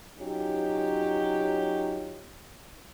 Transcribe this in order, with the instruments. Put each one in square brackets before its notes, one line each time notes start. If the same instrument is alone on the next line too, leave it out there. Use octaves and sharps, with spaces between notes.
[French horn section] F#3 C#4 D#4 F4 G4